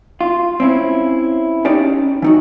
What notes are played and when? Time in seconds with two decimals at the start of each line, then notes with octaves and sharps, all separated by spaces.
0.21 F4
0.60 C4 C#4 E4
1.65 C#4 D#4 G4 C#5 D5
2.22 E3 D#4 F#4